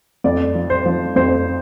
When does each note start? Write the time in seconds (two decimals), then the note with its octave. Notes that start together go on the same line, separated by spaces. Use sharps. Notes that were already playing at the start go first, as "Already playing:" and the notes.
0.24 F2 D5
0.55 F3
0.70 C5
0.86 F3
1.16 F2 C5